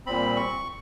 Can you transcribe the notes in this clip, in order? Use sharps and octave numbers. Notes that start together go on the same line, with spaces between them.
A#2 G3 C4 B5
C#6